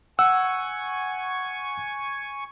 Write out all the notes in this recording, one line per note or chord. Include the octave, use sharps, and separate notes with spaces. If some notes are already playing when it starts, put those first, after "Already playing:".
F#5 G#5 C#6 E6